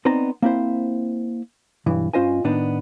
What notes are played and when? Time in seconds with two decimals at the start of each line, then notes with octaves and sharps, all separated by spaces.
0.05 B3 C4 D#4 C5 D5 A#5
0.42 A#3 C4 E4 C5
1.86 B1 G2 E3
2.13 G2 C#4 F4 C5 D#5 G#5
2.44 A2 D#3 B3 D4 D#4